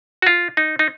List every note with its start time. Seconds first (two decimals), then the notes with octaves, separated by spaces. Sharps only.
0.22 F#4
0.27 F4
0.57 D#4
0.79 D#4